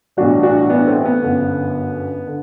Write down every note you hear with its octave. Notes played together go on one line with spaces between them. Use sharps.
B1 A2 E3 G3 D4 F#4
D4 F#4
B3 D4
A3 C4
B3
G1 F#2 D3
D3